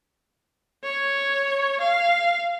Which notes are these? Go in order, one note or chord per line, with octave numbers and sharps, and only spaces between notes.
C#5
F5